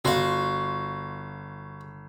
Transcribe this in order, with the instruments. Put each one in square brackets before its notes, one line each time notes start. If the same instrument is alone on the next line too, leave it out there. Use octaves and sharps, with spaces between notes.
[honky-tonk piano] G1 C6 [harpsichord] F#4 F5